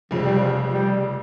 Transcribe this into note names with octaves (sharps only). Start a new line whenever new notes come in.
F1 F2 C#3 F3
G3
F3
G3